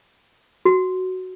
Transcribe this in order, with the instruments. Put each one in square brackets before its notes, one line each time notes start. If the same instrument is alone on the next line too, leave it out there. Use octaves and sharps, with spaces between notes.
[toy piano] F#4